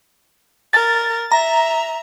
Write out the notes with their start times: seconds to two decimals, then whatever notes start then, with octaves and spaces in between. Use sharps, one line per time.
0.73 A#4 A6
1.32 E5 A#5